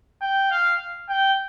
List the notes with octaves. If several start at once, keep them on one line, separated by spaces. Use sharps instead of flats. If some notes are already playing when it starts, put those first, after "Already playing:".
G5
F5
G5